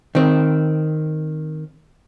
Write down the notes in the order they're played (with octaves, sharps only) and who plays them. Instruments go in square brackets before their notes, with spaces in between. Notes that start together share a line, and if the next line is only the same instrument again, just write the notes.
[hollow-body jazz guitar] D#3 C4